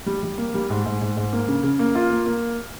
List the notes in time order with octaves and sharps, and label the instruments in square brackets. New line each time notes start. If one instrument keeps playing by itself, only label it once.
[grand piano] G3
G3
A#3
G3
G#2
G#2
G#2
G#2
A#3
C#3
C#3
A#3
F4
A#3
A#3